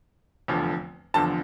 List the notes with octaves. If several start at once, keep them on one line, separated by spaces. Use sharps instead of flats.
F1 E2 D3 F3
F1 E2 D3 F3 A5